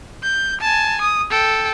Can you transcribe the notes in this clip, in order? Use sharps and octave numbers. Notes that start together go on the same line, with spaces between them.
G6
G#5 A5
D#6
A4 G5